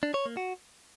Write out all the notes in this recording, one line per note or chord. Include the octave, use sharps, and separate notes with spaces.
D4
C#5
A#3
F#4